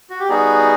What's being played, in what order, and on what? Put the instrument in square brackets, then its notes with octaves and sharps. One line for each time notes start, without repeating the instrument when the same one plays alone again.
[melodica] F#4
G4
G3 B3 D#4 F#4 G#4